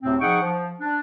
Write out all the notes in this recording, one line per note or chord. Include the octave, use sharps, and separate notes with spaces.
D2 A2 C3 C4
F3 D#4 G#4 F#5 G5 C#6
F3
D4